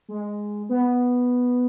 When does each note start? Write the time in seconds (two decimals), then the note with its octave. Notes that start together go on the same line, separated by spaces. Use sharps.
0.09 G#3
0.69 B3